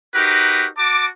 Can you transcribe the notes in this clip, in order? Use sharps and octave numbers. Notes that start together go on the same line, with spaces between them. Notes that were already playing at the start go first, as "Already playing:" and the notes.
D#4 F#4 G4 A#4 B4
F#4 A5 D6